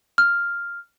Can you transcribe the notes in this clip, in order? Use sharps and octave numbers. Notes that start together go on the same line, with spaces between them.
F6